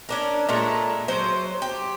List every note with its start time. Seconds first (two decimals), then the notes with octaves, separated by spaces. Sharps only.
0.09 C#4 D4 A#4
0.49 A#2 G#3 A3 A#4
1.08 F#3 C5
1.62 G4